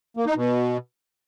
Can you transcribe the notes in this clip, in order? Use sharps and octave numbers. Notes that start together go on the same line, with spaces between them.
A#3
D#4
B2